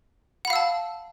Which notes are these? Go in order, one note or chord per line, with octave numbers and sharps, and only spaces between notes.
F5 F#5 A5 B5 E6